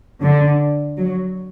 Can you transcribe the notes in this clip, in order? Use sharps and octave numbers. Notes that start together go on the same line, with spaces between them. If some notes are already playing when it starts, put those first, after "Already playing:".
D3
F#3